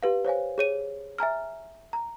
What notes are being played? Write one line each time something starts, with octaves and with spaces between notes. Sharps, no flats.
G4 B4 F5
C5 C#5 F5 G#5
G#4 C#5 D#7
E5 G#5 A#5 F6
A#5